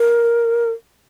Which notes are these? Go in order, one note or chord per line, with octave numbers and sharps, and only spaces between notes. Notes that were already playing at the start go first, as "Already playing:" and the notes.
Already playing: A#4